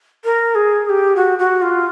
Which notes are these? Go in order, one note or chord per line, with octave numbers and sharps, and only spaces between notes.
A#4
G#4
G#4
G4
F#4
F#4
F4